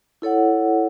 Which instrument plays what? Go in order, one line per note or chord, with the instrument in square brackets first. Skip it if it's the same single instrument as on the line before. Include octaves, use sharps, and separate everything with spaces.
[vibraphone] E4 A4 C#5 F#5